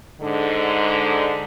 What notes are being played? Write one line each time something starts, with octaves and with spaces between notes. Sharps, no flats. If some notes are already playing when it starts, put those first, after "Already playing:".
G#2 D3